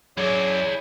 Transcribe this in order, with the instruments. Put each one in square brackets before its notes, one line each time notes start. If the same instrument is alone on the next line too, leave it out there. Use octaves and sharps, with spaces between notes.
[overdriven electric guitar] F#2 [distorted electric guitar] E4 D5 [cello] G#4 [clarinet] C#5